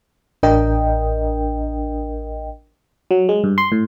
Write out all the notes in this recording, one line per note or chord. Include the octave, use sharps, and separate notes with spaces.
A1 D4 A#4 D#5 G5
F#3
G#3
G2
C6
A2